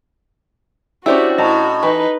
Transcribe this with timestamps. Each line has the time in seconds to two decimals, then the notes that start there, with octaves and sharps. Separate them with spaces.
1.06 C#4 D4 E4 F#4 G4 C5 D5 E6
1.38 A2 D#5 A5 A#5
1.83 E3 D#4 B4